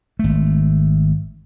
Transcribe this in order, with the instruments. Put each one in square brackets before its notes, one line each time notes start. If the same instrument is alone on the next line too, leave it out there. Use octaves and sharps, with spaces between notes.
[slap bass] G#1 A3